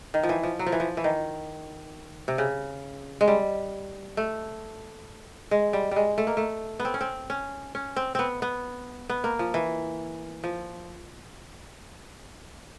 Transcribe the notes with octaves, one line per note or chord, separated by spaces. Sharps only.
D#3
F3
E3
F3
F#3
F3
E3
F3
E3
D#3
C3
C#3
G#3
G3
A3
G#3
G3
G3 G#3
A3
A#3
A3
B3
C4
C#4
C4
C#4
C#4
C4
B3 C4
B3
B3
A#3
F3
E3
F3